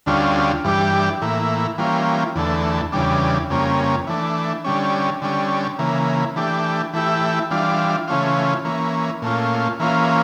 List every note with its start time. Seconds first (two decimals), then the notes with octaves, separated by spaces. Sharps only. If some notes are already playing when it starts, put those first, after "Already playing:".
0.06 D2 D3 G3 C#4 F4
0.64 G2 E3 G3 D4 G4
1.21 A2 E3 A#3 E4
1.78 E3 G3 A#3 C#4 F4
2.35 E2 D3 A3
2.92 E2 C#3 G3 D4
3.50 F2 C#3 G3 A#3 C#4
4.07 E3 A3 D4
4.64 D3 G3 C#4
5.22 D3 G3 C#4
5.79 C#3 E3 A#3
6.36 E3 A3 D4 G4
6.94 E3 A3 E4 G4
7.51 E3 G3 D4 F4
8.08 C#3 E3 A3 C#4 F4
8.65 E3 A#3 C#4
9.22 A#2 A3 C#4 F4
9.80 E3 A#3 C#4 F4